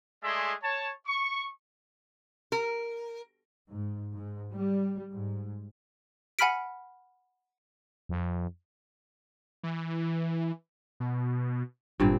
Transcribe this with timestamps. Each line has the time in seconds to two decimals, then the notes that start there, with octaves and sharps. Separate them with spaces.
0.24 G#3 A3 G#4 D5 E5 C6
0.63 C#5 A5
1.07 C#6
2.52 A#4
3.69 G#2
4.13 G#2
4.52 G3
5.10 G#2
6.39 F#5 G#5 B5 F6 B6 D7
8.09 F2
9.63 E3
11.00 B2
12.00 G#1 G2 A#2 C4